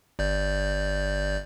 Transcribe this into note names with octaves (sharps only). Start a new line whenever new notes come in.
G1 D5 G6